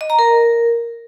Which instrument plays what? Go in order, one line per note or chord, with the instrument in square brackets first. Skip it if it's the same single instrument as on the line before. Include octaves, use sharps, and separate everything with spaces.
[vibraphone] D#5
A#5
A#4